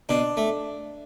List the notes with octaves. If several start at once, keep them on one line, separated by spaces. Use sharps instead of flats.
B2 D4
A3